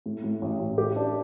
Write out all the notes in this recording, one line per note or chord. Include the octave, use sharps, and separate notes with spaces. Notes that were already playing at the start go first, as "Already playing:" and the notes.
A2
A2
A1
A1
G4
D4